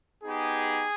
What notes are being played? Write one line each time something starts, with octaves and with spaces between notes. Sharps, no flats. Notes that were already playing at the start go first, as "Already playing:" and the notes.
B3 D#4 G4 G#4